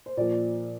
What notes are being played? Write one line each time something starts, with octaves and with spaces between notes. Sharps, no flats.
C5
A#2 F3 D5